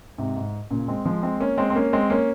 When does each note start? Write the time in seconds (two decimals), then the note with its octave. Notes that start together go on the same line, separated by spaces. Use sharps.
0.18 G#2 C3
0.37 G#2
0.71 A#2 C#3
0.88 G#3 C4
1.05 F3 G#3
1.23 G#3 C4
1.40 A#3 C#4
1.58 G#3 C4
1.70 C4
1.76 A#3 C#4
1.93 G#3 C4
2.10 A#3 C#4